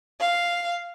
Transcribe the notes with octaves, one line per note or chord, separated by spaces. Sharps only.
F5